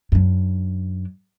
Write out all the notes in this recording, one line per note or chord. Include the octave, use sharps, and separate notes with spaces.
F#2 D4